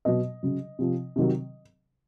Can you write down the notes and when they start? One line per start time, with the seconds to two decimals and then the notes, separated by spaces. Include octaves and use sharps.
0.05 B2 F#3 D#5
0.43 C#3 F#3
0.79 C3 F3
1.16 C3 D#3 F#3